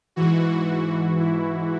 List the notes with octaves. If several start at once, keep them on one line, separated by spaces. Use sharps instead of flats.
G#2 E3 F#4
F#4
E4